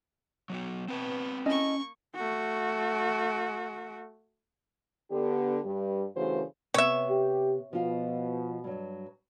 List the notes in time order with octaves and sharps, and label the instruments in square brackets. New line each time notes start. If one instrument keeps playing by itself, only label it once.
[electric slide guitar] F#3 B3 F#4
[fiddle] B3 [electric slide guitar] C4 B4 A5
[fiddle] A#3 C#6 [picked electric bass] C#4 [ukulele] E4 A4 D#5
[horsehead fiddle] A3 F#4
[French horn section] D3 B3 G4
G2 G3
G2 C#3 E3 A3 F#4 C5
[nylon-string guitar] C3 B3 [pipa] C#5 E5
[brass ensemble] G4
[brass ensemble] B2 [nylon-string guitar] F3 F4
[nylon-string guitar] G2 F#3